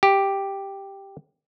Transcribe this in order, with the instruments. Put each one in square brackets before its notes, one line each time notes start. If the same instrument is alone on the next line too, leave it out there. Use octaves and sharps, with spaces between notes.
[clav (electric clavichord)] G4